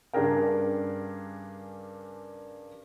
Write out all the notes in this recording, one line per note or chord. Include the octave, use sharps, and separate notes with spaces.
G2 C#3 D4 G#4 A#4 G5